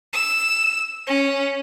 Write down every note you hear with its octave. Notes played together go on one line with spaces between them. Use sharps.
E6
C#4